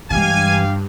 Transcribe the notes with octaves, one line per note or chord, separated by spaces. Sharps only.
G2 E3 G#3 G4 F5 G#5